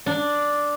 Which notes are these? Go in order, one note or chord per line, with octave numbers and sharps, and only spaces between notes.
D4